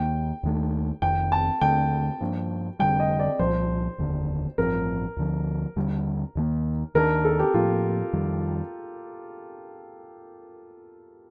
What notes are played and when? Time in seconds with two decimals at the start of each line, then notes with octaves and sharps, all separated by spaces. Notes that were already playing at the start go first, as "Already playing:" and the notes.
Already playing: D#2 D#3 A#3 G5
0.43 D#2 D#3 A3
1.02 F1 F2 D#3 G5
1.32 A5
1.61 D#2 D3 A3 G5
2.21 G2 F3 A#3 D4
2.79 F1 D#2 D3 G3 G5
3.00 D#5
3.20 D5
3.39 C2 A#2 F3 C5
3.98 F1 D#2 D3
4.58 A1 G2 F3 C4 A#4
5.17 D2 D3 F3
5.76 D#2 D3 G3
6.35 D#2 D#3 A#3
6.94 D#2 D#3 G3 D4 A#4
7.25 A4
7.39 G4
7.54 A2 F3 A#3 F4
8.13 F2 D#3 G3